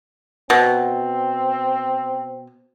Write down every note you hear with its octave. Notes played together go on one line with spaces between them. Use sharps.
B2 C4